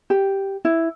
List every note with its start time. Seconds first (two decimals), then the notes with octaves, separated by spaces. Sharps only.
0.10 G4
0.65 E4